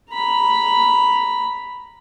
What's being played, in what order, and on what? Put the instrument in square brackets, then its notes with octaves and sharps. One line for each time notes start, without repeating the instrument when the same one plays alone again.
[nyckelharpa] A#5 B5